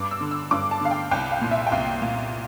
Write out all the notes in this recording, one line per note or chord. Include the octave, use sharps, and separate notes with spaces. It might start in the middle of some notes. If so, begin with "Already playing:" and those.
Already playing: G2 D6
E6
D3
E6
G2 D6
A5
D3 F5
G5
C2 G5
F5
A#2
E5
G5
C2 F5
A#2